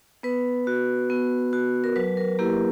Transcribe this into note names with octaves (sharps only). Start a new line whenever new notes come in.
B3 B4
F#4
B3
F#4
A#4
F#3 B4
A#4
A#3 E4 G4